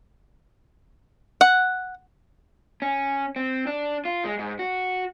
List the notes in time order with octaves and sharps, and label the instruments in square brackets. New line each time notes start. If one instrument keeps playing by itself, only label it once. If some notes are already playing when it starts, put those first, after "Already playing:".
[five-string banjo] F#5
[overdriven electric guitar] C#4
C4
D4
F4
G#3
G#2
F#4